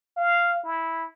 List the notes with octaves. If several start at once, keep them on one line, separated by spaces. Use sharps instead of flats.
F5
E4